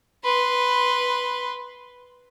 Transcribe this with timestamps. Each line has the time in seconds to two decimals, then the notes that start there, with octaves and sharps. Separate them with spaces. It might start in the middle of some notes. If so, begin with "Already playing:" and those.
0.24 B4 C6